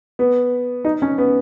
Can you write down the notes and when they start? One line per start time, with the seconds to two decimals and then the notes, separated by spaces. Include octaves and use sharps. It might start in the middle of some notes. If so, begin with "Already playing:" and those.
0.19 B3
0.85 D#4
1.02 C#4
1.18 B3